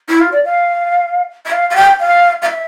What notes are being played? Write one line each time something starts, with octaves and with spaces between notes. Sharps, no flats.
E4
F4
D5
F5
E5
F5
F5
G5
F5
F5
E5